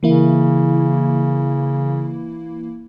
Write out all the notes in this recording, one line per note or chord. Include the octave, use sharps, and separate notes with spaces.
C#3 E3 A#3 E4